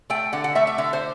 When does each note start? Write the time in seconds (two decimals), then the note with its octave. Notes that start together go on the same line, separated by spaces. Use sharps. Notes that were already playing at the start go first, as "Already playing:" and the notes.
0.10 A3 G5
0.33 D3 F#5
0.44 F#5
0.55 A3 E5
0.67 E5
0.78 D3 E5
0.93 C5